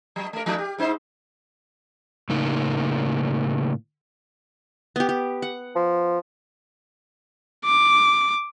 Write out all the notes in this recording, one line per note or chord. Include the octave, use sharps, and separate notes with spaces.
F#3
A3 A#4
F3 A3 D#4
G4
G#2 D#4 C5
A2 C#3 A#3 D#4
B3 G4
G4
F#5
F3
D6